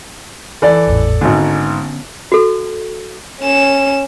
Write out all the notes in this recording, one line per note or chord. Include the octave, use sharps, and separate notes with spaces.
E3 A4 D5
G#1 E2 A2
G#1 G#2 D3 B3 C#4
F#4 A4
C#4 E7